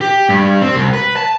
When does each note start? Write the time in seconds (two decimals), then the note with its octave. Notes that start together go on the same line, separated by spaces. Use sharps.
0.01 G4
0.29 G2
0.62 C4
0.75 C2
0.93 B4
1.16 A5